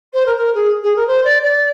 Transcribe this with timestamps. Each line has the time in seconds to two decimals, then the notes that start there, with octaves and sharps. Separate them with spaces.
0.13 C5
0.26 A#4
0.36 A#4
0.54 G#4
0.83 G#4
0.96 A#4
1.07 C5
1.24 D5
1.42 D5